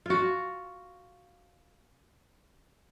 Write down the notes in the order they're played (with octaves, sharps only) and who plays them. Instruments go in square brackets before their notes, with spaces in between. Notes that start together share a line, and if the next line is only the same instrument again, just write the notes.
[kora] F4 F#4